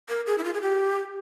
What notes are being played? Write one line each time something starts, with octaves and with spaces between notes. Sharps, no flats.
A#4
G#4
E4
F4
G#4
G4